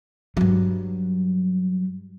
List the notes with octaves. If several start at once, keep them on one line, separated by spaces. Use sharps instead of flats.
G2 F#3